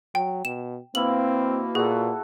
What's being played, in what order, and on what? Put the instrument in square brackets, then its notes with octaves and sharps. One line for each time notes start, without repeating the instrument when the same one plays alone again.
[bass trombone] F#3 [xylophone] G5
[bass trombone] B2 [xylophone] E7
[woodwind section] B2 A#3 [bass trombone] C4 [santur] E4 E5 F5 [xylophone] F#7
[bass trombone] A#2 [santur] F#4 A4 [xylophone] G#4